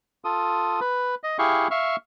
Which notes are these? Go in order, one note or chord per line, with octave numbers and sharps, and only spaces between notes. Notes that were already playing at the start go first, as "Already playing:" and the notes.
F4 A4 D#6
B4
D#5
E4 G4 G#4 F5 C#6
E5 F5 C#6 F6